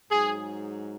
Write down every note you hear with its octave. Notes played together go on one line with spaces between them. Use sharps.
G#2 F#3 G#4